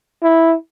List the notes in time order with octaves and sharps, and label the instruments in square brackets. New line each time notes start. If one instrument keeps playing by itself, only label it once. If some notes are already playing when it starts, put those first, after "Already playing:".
[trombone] E4